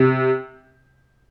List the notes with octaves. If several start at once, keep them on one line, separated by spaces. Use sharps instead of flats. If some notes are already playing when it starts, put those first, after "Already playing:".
Already playing: C3